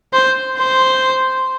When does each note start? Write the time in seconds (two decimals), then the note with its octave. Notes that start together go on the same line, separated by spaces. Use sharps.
0.13 C5
0.58 C5